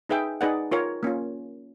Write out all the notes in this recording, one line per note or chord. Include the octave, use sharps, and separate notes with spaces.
D#4 G#4 B4 E5 G5
D#4 G#4 B4 D5 F#5
F4 A#4 C#5
A#3 C#4 F4